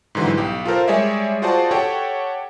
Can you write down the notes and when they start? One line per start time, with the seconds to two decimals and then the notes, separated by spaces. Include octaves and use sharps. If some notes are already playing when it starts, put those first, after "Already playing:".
0.15 G#2 D3 E3 F#3 G3
0.37 B1 G4
0.65 F4 A4 A#4 C5
0.88 G3 G#3 G#4 C#5 D5 E5
1.42 F4 F#4 G#4 C5 D5 A5
1.71 G4 A4 C#5 F#5 G5